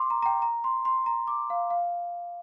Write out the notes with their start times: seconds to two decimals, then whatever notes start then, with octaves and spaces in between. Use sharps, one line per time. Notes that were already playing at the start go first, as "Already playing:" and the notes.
Already playing: C6 D6
0.10 A#5
0.22 A#5
0.26 G5
0.42 A#5
0.64 C6
0.85 C6
1.06 A#5
1.27 D6
1.50 F5
1.70 F5